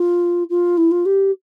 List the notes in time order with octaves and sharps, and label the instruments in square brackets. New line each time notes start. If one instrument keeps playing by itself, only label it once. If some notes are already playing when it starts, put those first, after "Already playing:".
Already playing: [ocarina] F4
F4
E4
F4
G4